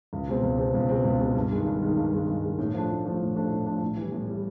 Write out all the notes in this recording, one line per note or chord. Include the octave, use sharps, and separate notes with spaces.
C#2
B2 G#3 C4
C#2
B2 G#3 C4
C#2
B2 G#3 C4
C#2
B2 G#3 C4
G2
D#3 G#3
G2
D#3 G#3
G2
D#3 G#3
G2
D#3 G#3
A2
F3 A3 D4
A2
F3 A3 D4
A2
F3 A3 D4
A2
F3 A3 D4
A2
E3 G3
A2
E3 G3